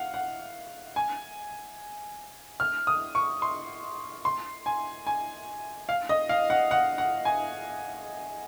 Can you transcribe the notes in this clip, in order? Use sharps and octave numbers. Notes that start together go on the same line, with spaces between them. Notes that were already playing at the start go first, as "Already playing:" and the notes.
Already playing: F5 F#5
F#5
G#5
F6
D#6
C#6
C6
C6
G#5
G#5
F5
D#5
F5
F#5
F#5
F#5
G#5